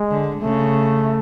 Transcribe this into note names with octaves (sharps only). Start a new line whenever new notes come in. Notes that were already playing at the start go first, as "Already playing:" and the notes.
Already playing: G#3
D3
C#3 A3